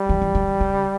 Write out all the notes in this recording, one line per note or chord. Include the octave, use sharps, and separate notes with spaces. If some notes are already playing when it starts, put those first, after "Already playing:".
Already playing: G3
E3
E3
D3
C#3